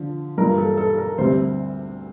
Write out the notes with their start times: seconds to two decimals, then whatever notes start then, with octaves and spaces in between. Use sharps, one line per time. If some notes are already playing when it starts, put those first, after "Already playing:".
Already playing: D3 F3
0.38 G2 E3 A#3 F4 A#4
0.58 A4
0.77 A4
0.98 A#4
1.18 D2 C3 G3 C4 C5